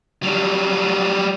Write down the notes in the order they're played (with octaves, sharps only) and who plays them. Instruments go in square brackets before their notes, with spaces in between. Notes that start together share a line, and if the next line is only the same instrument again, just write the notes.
[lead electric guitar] F#3 G3